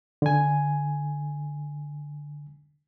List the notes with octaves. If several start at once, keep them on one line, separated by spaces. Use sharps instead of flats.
D3 G#5